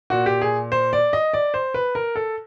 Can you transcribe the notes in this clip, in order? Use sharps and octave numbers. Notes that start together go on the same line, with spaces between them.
A#2 F#4
G4
G#4
C5
D5
D#5
D5
C5
B4
A#4
A4